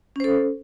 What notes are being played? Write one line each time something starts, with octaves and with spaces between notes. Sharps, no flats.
C#4 A4 C5